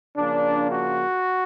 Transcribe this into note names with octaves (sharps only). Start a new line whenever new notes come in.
C#3 F3 A#3 D4
F#4